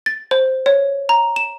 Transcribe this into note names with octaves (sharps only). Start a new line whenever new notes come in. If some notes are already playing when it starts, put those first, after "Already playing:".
A6
C5
C#5
A#5
E7